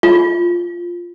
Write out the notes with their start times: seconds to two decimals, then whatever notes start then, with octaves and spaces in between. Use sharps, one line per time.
0.03 F4